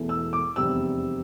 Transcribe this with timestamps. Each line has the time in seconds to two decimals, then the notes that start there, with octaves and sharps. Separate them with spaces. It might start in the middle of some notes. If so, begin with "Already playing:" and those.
Already playing: E1 E2 E3 A3
0.09 E6
0.33 D6
0.56 F1 E2 C3 G3 E6